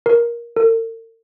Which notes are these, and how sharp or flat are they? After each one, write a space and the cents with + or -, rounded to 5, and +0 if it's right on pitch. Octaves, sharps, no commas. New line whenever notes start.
A#4 +15
A#4 -45